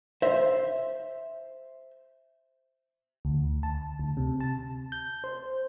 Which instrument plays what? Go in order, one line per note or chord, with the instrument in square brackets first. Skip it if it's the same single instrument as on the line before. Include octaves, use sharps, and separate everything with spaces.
[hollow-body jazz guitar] C5 E5
[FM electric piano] D2
A5
D2
C3
A5
G6
C5